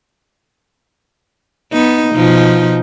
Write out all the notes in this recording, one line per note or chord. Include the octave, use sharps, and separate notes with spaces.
B3 D#4
B2 F3 D#4